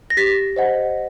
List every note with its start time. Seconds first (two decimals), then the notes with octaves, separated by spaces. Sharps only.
0.10 A#6
0.17 G4 A6 B6
0.56 C5 D#5 F#5